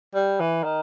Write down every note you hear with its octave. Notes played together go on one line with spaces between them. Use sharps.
G3
E3
D#3